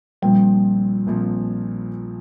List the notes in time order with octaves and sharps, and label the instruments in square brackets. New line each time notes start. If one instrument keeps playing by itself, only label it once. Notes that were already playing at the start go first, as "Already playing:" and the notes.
[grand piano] A#1 A#2 F3 C4 [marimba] G3
[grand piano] A#1 A#2 F3 C4